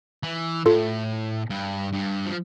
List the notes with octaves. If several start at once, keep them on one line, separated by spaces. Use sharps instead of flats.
E3
A2 F4 A4
G2
G2
F3